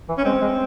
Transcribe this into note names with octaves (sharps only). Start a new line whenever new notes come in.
E3
C#4
G#3 C4
G#3